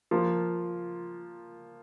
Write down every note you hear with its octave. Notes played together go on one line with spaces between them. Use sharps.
F3 A#3 F4